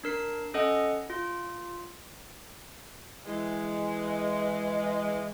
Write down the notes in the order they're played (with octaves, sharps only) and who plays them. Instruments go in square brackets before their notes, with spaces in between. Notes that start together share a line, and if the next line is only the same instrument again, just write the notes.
[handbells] D4 A#4 C7
C#4 A4 D#5 F#5
F4
[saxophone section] E3 G#3